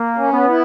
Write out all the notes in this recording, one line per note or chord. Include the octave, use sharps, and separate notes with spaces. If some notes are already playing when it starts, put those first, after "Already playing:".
Already playing: A#3
C#4
B3
E4